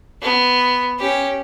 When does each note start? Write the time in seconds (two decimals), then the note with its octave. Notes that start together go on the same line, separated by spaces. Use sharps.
0.22 B3
0.99 C#4 G4